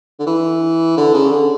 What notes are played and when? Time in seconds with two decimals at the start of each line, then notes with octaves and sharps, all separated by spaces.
0.19 D3
0.26 E3
0.97 D3
1.14 C#3
1.32 D3